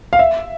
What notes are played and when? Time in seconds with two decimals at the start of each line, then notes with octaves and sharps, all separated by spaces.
0.13 F5
0.19 E5